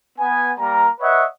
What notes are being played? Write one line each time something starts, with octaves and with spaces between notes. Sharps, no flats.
B3 G#5
G3 A#3 A#4 A#5
B4 C#5 D#5 E5 F#5